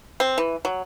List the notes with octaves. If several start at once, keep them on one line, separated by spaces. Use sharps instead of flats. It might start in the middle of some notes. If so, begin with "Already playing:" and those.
C4
E3
F#3